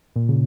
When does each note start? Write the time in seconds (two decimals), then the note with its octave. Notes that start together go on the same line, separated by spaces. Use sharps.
0.16 A#2
0.29 C#3